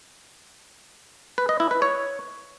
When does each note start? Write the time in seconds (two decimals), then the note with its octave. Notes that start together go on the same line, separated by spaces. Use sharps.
1.38 B4
1.49 D#5
1.60 E4
1.71 B4
1.82 C#5